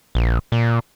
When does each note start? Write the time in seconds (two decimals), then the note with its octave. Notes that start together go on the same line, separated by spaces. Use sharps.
0.15 A#1
0.52 A#2